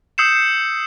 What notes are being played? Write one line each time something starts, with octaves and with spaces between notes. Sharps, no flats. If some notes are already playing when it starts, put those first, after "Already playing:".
D#6 E6 G6 C7 C#7 E7